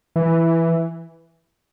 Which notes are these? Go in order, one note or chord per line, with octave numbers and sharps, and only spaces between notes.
E3